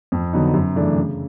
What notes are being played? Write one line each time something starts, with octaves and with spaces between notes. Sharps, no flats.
F2
D3 F#3 B3 D#4
F#2
C#3 E3 A3 D4
C#3